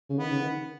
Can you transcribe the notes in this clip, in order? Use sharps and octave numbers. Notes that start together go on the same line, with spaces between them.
C#3
D#3 B3
C#3
D#3